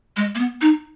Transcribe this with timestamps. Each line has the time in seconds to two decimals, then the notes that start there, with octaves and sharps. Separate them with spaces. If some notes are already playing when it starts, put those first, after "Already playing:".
0.17 G#3
0.35 A#3
0.39 B3
0.61 D#4